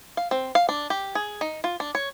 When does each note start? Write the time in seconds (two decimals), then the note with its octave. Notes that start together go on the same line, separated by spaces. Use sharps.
0.17 F5
0.31 C4
0.55 F5
0.69 D4
0.90 G4
1.15 G#4
1.41 D#4
1.64 F4
1.80 D4
1.95 C#5